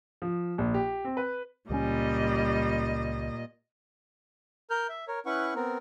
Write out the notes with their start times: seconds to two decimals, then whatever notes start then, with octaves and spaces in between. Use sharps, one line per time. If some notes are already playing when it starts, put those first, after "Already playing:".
0.22 F3
0.58 A#1
0.74 G4
1.05 C4
1.17 B4
1.70 C#2 A#2 F#3 G3 C#4 D#5
4.70 A#4 F6 G6
4.89 E5
5.08 A#4 C#5
5.26 C#4 E4 B4 F#5 C#6
5.55 B3 C4 A#4